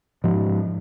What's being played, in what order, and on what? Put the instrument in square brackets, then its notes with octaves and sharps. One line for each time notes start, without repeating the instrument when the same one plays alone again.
[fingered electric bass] G#2 F3